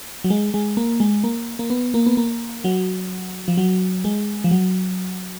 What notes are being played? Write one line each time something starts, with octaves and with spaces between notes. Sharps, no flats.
F#3
G#3
G#3
A#3
G#3
A#3
A#3
B3
A#3
B3
A#3
F#3
F3
F#3
G#3
F3
F#3